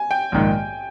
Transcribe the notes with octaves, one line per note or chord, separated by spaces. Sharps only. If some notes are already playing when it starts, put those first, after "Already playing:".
Already playing: G#5
G5
A#1 G#2 D#3